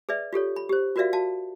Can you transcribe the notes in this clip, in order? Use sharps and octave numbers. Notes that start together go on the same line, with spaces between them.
G#4 B4 D5 E5
F4 G4 A4 C#5
B5
G4 C5
F4 F#4 A#4 D5 E5 F5
F#4 F5 A5